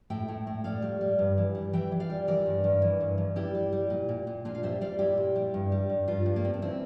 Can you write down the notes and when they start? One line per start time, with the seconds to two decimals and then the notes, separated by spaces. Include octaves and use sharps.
0.10 A2 E5 G5
0.28 A2
0.47 A2
0.64 A2 D5 F5
0.82 G3
1.01 G3
1.19 G2
1.38 E3
1.55 G3
1.73 E3 E5 G5
1.92 E3
2.00 D5 F5
2.10 G3
2.28 E3 A#4 D5
2.46 G2
2.64 G2
2.82 E3
3.00 G2
3.18 G2
3.36 G3 E4 G4
3.55 G3
3.72 G3
3.90 A#2
4.09 A#2
4.27 A#2
4.45 A#2 D4 F4
4.55 F5
4.63 G3 C5 E5
4.81 G3 D5 F5
4.99 A#2 E4 G4
5.18 A#2
5.36 G3
5.54 G2
5.72 G3
5.89 G2
6.08 G2 D4 F4
6.26 G2
6.36 A#3
6.44 G2 C4
6.54 D4
6.62 E3 C4 E4